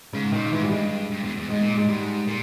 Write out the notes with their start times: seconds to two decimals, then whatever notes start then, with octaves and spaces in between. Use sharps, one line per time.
0.13 G#2 C#3
0.32 A#2 D#3
0.52 G#2 E3
0.63 G3
0.71 G2 G#3
1.11 G2
1.23 E2
1.36 E2
1.49 G#2 G#3
1.62 A#2
1.75 G#2 G#3
1.88 G#2 G3
2.27 A#2